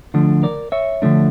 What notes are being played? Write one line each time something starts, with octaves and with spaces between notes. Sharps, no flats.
D3 F3 A3 D4
A#4 D5
C#5 E5
D3 F3 A3 D4